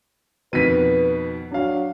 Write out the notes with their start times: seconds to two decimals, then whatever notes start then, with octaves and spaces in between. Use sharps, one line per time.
0.53 F2 B2 D#3 B4 B6 D#7
1.52 F#3 D4 F5